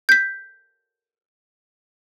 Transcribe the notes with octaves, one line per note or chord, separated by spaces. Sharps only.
G6 B6